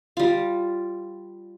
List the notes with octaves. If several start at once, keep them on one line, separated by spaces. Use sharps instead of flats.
G3 F4